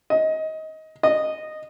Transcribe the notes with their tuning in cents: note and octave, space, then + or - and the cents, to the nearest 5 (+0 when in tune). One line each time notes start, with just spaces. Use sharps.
D#5 +20
D#5 -10